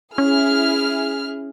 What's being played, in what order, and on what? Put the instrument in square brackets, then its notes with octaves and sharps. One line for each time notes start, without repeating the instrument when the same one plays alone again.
[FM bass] C#4 [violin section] E4 G#4 F6